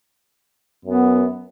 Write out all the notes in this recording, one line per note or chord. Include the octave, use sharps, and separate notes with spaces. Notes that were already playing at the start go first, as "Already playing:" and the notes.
F#2 B3